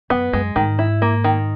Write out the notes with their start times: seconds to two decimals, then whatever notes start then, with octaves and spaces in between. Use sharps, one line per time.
0.10 F#2 B3
0.33 F#2 G#3
0.56 G#2 D#3
0.79 E4
1.02 A#3
1.24 D#3